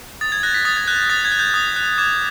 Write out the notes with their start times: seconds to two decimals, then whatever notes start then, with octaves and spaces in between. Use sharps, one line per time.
0.21 D#6 A6
0.32 G#6
0.43 F#6 A#6
0.54 B6
0.65 D#6 A6
0.77 G#6
0.87 F#6 G6
1.09 D#6 A6
1.25 G#6
1.32 F#6
1.39 G6
1.54 D#6
1.76 F#6
1.98 D6 G#6